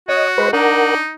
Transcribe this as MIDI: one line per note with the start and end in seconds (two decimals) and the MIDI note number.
0.09 0.49 66
0.09 0.31 73
0.09 0.28 75
0.38 0.50 56
0.38 0.49 71
0.38 0.49 72
0.53 0.98 62
0.53 1.13 63
0.53 0.94 70
0.53 0.94 78